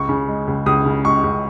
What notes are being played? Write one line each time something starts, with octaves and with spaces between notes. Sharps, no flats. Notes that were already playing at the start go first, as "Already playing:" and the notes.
Already playing: C#2 C#6
C#3
G#3
C#2
C#2 D#6
C#3
G#3 C#6
C#2